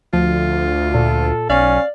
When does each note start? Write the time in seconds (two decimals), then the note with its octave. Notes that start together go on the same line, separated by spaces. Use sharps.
0.13 D2 F3 F4
0.94 A#2 A4
1.50 B1 C#4 D5 F5